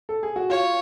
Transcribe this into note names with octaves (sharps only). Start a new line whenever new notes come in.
A4
G#4
F#4
F4 C#5